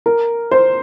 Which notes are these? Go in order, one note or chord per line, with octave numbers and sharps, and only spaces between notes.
A#4
C5